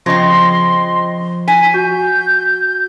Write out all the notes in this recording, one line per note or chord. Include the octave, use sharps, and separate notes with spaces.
C#3 F3 C4 D#5 C6 A#6
G#5 B6
F#4 G6